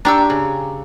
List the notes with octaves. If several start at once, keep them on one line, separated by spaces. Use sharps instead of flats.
D4 G4 A#5 C#6 E6
C#3